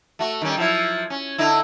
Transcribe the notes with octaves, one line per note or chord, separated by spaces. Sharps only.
A3 F#4
D#3 G3 C#4
F3 F#3 E4
C#4
D3 D#4 E4